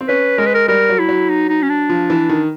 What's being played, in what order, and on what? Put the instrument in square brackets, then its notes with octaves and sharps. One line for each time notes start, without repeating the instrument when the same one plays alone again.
[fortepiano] C4
[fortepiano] C#4 [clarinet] B4
[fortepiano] G#3 [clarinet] A#4
[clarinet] B4
A#4
[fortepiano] G3 [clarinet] A#4
[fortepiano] F#3
[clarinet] E4
[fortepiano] F#3
[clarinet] D#4
D#4
C#4
D4
[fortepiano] F3
E3
D#3